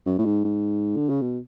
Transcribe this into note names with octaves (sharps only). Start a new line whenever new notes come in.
F#2
A2
G#2
G#2
D3
C#3
B2